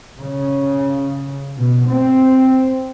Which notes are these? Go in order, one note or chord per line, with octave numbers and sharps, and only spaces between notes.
C#3
B2
C4